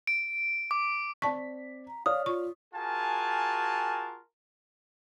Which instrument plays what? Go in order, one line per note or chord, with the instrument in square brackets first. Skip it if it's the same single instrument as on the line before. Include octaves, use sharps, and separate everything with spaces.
[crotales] D7
D6
[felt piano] C4 D5 B6 [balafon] A5 C#6
[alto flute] A#5
[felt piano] C#5 D5 F6 [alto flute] F5 [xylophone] D#6
[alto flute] F4 [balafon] C#6
[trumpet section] F4 F#4 G#4 A#4 G#5 A5